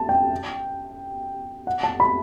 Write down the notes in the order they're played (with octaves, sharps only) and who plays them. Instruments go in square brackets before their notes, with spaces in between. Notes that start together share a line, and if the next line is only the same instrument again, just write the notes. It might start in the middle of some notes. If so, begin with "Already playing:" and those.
Already playing: [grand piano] A5
G5
F#5
A5
B5